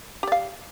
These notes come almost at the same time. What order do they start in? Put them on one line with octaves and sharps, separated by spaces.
G4 D5 F5